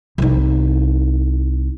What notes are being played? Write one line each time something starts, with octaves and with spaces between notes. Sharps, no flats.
C2 D#4